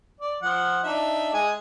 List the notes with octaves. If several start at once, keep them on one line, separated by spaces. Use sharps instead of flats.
D5
F3 F#5
D4 D#4 E5
G#3 G#5